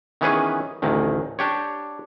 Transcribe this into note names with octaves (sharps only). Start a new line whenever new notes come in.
D#3 E3 B3 C#4 G#4 B4
A1 D2 D#3
D4 G4 C#5